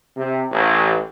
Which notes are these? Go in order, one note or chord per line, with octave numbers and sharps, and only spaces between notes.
C3
A1